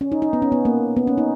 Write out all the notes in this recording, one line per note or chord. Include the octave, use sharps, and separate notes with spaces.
C#4
D#4
D#4
B3
C#4
B3
A#3
B3
C#4
D#4